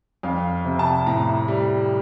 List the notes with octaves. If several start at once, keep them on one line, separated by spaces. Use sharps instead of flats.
F2 F5
C3
A5
A2 A#5
G3